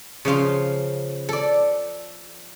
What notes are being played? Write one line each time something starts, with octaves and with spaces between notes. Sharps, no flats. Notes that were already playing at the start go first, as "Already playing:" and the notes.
C#3 F3 F5 C6
A4 D5